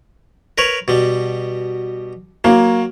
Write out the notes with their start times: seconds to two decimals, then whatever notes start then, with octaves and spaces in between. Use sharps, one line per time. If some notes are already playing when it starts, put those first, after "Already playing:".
0.58 A#4 B4 C#5
0.88 B2 G3
2.44 F#3 A#3